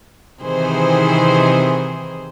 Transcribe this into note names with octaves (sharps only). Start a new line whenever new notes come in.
C3 D#3 E3 G#4 C5